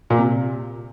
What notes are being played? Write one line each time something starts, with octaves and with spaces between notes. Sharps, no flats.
A#2
C3